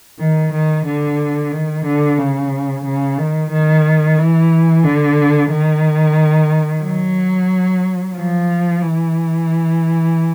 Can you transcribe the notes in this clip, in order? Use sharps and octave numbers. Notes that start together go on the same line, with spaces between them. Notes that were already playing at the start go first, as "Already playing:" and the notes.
D#3
D#3
D3
D#3
D3
C#3
C#3
D#3
D#3
E3
D3
D#3
F#3
F3
E3